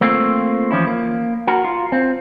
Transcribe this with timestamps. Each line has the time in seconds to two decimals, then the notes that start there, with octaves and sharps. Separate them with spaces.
0.01 A3 A#3 C4 F4
0.71 E3 F3 C#4 E4
0.87 A#3
1.47 F#4 A#4
1.64 F4
1.92 C4